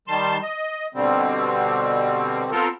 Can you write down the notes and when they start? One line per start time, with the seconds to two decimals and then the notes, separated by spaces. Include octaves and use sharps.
0.08 D#3 G3 A5 C6
0.43 D#5
0.95 B2 D3 G3 C4
2.52 B3 C4 F4 A4 A#4